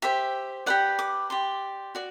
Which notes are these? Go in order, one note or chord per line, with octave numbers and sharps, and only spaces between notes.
G4 C5 E5
G4 B4 D5 F#5
D6
G4 D5 C6
F#4 D5